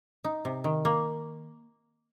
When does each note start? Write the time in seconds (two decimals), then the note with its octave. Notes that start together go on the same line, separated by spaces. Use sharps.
0.24 D#4
0.45 C3
0.64 D#3
0.85 A#3